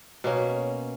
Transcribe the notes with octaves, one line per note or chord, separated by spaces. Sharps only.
B2 A#3 C#4